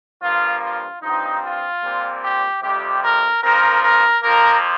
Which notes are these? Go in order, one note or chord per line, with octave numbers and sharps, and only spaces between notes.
G2 F3 A#3 F4
F4
G2 F3 C4 D#4
F4
A#2 G3 C4
G4
F2 C3 G3 G4
A#4
G2 F3 C4 A#4
A#4
F2 F3 A#3 A#4